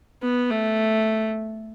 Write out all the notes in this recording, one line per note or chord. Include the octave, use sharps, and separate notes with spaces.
B3
A3